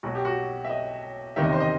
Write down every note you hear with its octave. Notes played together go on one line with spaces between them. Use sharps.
B1 B2 F#3 F#4
G4
F#4
E5
D#5
F#1 E2 C3 D#3 E5
D#5
C5
D#5